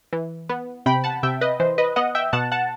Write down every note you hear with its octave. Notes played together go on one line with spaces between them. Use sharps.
E3
B3
C3 G5 B5
F#5 A5
C3 E5 G5
B4 D#5
E3 C5
B4 D#5
B3 D#5 F#5
E5 G5
B2 F#5 A5
F#5 A5